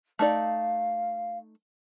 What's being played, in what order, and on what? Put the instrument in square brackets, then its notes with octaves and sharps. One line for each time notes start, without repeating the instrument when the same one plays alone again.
[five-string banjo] A3 D#4 D5 [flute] F5